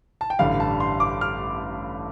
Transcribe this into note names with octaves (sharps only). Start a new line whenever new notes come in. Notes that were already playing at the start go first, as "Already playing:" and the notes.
A5
G5
A1 G2 D3 G3 F5
A5
C6
D6
F6